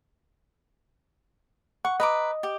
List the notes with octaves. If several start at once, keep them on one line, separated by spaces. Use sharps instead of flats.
F#5 C#6
B4 D#5 A#5 D6
G4